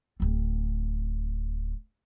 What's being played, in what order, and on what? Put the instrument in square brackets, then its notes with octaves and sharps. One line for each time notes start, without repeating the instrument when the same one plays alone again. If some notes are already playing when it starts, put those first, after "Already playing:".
[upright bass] D1 C4